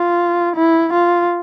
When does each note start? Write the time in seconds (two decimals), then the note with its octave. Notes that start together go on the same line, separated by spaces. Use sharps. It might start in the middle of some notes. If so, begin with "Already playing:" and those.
Already playing: F4
0.56 E4
0.93 F4